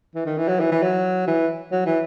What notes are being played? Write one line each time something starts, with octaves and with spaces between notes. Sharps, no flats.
E3
D#3
E3
F#3
E3
E3
F#3
E3
F#3
E3